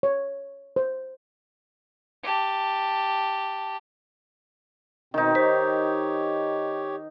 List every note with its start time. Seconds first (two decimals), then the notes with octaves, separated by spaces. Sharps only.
0.03 C#5
0.76 C5
2.23 G4 A5
5.14 B2 D#3 C4 D#4
5.35 G4 C5 C#5 B6